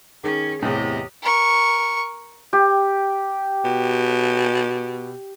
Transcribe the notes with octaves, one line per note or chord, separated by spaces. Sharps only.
D#3 C#4 G#4
E2 A2 C3 G4 D#5
A#4 C#6
G4
B2